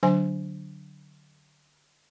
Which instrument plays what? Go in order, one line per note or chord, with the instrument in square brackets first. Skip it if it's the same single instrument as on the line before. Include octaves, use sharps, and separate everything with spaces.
[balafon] D3 F#3 D4 C5 G#5 C6